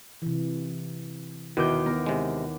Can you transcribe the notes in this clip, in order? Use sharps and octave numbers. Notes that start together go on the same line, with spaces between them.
C3 E3
D#2 B2 E4 A#4 D6 G6
B3 A#4
C3 G#3